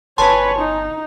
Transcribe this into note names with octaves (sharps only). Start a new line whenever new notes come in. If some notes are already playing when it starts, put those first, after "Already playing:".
G1 B4 C#5 G#5 A5 C6
D#4